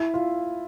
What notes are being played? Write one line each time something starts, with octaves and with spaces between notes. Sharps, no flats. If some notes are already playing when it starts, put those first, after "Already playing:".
Already playing: E4
F4